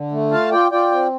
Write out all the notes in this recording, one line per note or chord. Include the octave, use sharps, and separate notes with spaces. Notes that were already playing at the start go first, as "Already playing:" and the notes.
Already playing: D3
A3
F4 F5 A5
F4 D5 G5
F4 D5 G5
C4